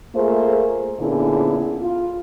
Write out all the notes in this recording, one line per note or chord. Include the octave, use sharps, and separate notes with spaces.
A3 A#3 F4 G#4 C5
A#2 D3 B3 C#4 E4 G#4
F4